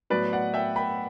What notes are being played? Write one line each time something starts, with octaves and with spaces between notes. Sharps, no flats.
A2 F#3 B3 B4 D5
D5 F#5
E5 G5
G5 B5